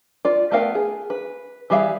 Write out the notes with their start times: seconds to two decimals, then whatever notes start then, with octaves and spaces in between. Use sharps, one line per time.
0.25 F4 D5
0.51 A3 B3 A#4 F5 G5
0.75 G#4
1.10 B4
1.70 E3 G3 G#4 E5 F5